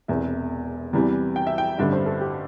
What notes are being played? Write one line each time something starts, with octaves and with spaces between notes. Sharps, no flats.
E1 E2 C3 E5
E2 C3 E3 G3
G5
E5
G5
A1 G2 D3 G3 E5
C5
A4
G4